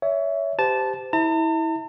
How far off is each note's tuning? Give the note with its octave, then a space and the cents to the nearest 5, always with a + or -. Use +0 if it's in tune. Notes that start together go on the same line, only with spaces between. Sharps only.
C#5 +25 E5 +0
G4 +0 C5 -30 A5 -10
E4 -25 A5 +45